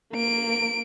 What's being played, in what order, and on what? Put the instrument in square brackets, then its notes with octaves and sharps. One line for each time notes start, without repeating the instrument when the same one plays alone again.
[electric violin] A#3 D7